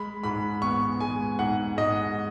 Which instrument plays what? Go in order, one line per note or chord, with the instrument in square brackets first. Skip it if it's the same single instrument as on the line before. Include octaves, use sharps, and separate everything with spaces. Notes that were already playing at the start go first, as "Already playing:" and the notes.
Already playing: [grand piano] G#3 B5
G#2 B5
B3 C#6
G#3 G#5
G#2 F#5
G#2 D#5